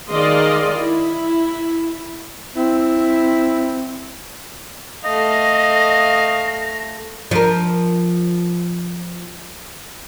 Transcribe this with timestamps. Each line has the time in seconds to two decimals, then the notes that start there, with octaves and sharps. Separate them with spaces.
0.12 D#3 G#4 D5 D#5 F5 C6
0.80 E4
2.56 C4 E4
5.04 A3 D#5 F5 A#6
7.31 F3 A#4